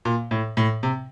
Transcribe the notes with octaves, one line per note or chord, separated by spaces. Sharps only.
A#2
A2
A2
C3